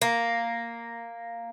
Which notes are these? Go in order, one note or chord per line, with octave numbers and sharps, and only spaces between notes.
A#3